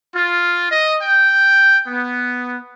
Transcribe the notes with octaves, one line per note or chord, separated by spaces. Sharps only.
F4
D#5
G5
B3